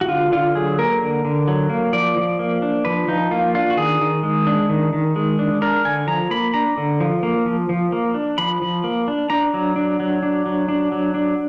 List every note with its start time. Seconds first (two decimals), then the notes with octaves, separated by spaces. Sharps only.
0.01 F#4
0.09 D3 F4
0.32 D3 F4
0.55 F#3 G#4
0.78 A#3 A#4
1.01 D3
1.25 D3
1.48 F#3
1.70 A#3
1.93 F3 D5
2.17 F3
2.39 A#3
2.62 D4
2.85 F3 B4
3.08 F3 D#4
3.31 A#3 F4
3.55 D4 F4
3.70 F#4
3.77 D#3 G#4
4.01 D#3
4.23 G#3
4.47 D4
4.69 D#3
4.93 D#3
5.16 G#3
5.39 D4
5.62 D4 A#4
5.85 D3 G#5
6.07 F3 A#5
6.31 A#3 B5
6.54 D4 A#5
6.77 D3
7.00 F3
7.23 A#3
7.46 F3
7.69 F3
7.92 A#3
8.14 D4
8.38 F3 B5
8.62 F3
8.84 A#3
9.08 D4
9.30 D4 A#5
9.54 F#3
9.76 D4
10.00 F#3
10.23 D4
10.46 F#3
10.69 D4
10.92 F#3
11.14 D4